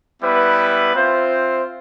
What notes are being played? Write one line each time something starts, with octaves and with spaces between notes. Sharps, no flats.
G3 B3 E4 B4
C4 F4 C5 E5